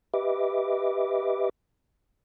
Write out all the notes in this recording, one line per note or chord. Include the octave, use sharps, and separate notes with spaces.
G4 B4 D#5 E5 D6